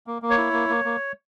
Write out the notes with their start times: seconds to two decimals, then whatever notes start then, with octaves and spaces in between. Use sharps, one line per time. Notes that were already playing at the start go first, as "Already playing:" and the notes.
0.07 A#3
0.22 A#3
0.30 C#5
0.38 E4
0.53 A#3
0.69 A#3
0.85 A#3